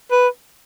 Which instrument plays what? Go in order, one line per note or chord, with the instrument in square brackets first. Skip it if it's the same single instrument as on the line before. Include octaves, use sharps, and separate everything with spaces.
[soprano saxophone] B4